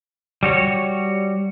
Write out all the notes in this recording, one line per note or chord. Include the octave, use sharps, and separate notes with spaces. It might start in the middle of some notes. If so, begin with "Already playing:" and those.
G3 F#4 C#5